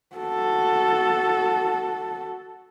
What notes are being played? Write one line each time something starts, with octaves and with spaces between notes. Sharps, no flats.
F#4 A4